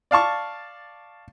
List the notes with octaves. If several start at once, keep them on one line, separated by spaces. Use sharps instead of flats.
D5 F5 A5 C#6